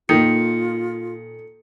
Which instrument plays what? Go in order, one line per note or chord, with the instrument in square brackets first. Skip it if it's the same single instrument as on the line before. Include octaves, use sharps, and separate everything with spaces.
[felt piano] A#2 A#3 [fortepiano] D#3 [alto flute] F4 [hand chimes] A4 C#7